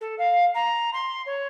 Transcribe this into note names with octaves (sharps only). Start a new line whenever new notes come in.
A4
F5
A#5
C6
C#5